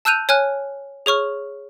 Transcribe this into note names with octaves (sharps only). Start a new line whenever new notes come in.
A5 E6 F#6 G6 D#7 F7
C#5 G#5 F6 F#6
G#4 C#5 C#6 F6